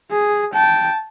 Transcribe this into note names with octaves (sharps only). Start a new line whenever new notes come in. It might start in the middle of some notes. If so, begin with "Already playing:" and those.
G#4
G5 A5